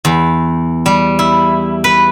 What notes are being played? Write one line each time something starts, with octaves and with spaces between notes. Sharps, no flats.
E2
G3
E4
B4